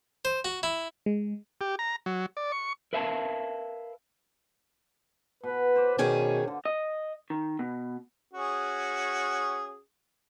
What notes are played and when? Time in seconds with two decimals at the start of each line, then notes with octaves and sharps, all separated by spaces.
0.25 C5
0.45 F#4
0.63 E4
1.06 G#3
1.61 G4
1.79 A#5
2.06 F#3
2.37 D5
2.52 C#6
2.93 A#4 B4 E5 F5 G#5 A5
5.44 B2 B4
5.76 C5 D5
5.99 B2 D#3 C#4 G#4 D5 F5
6.47 D3
6.65 D#5
7.30 D#3
7.59 B2
8.33 C#4 F#4 G#4